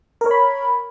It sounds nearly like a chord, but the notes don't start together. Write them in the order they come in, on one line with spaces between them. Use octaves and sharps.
A#4 C#5 B5